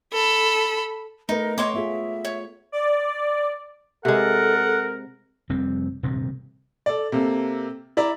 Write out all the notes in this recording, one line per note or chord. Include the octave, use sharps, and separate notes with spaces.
A4 B5
A3 B3 D#4 A#4 B4
B3 C#5 D#5 C6 D6
B3 F4 G#4 E5
C#5
D5
C3 G#3 A4 A#4 F#5
F1 G3 C4
D#1 G2 C3
A4 D5
C3 A#3 A4
E4 D5 E5 A#5